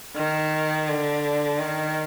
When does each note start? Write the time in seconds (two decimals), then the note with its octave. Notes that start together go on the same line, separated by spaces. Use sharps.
0.16 D#3
0.89 D3
1.59 D#3